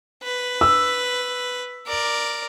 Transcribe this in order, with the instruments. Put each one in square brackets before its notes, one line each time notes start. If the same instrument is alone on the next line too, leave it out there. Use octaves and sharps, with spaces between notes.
[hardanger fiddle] B4
[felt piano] E6
[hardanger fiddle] A#4 D5